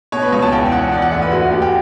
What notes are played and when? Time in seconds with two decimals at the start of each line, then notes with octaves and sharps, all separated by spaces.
0.12 B2 C#5
0.22 B4
0.32 C#2 C#5
0.42 A5
0.52 E2 G5
0.72 E2 F#5
0.92 E3 D5
1.02 F#5
1.11 D2 E5
1.22 B4
1.31 D2 F#4
1.42 F#4
1.51 D2 G4
1.62 G4